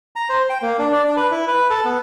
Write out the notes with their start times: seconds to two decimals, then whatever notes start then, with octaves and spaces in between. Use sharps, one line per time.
0.16 A#5
0.29 C5
0.50 G5
0.62 A#3
0.79 D4
0.93 D5
1.04 D4
1.17 B4
1.31 E4
1.48 B4
1.70 A4
1.85 B3